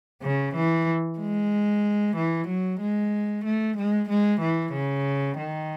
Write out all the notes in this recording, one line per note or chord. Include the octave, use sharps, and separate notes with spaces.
C#3
E3
G#3
E3
F#3
G#3
A3
G#3
G#3
E3
C#3
D#3